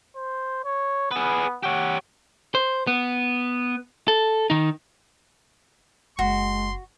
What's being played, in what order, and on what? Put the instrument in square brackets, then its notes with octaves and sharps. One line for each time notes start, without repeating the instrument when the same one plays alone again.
[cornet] C5
C#5
[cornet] B3 [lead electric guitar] G#4 B4
[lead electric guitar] G4 C#5 [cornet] F#5
[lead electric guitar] C5
B3
A4
D#3 D#4
[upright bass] F#1 [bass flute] G#3 [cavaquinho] F#4 [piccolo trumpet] C6